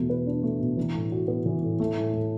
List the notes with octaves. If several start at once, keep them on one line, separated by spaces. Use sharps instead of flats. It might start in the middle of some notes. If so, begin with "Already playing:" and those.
Already playing: E2 B2 A3
B4
D4
A3
B2
E3
A2
F#4
B3
E3
A2
A3
A2
A2